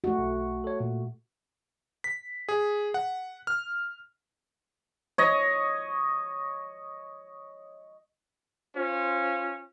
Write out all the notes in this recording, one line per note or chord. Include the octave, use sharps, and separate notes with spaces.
A3 F#4
B1
A4 C#5
A#2
B6
G#4
F#5
F6
C#5 D#5
C#4 F4 C5